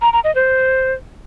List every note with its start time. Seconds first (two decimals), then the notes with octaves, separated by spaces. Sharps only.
0.02 A#5
0.13 A#5
0.24 D#5
0.35 C5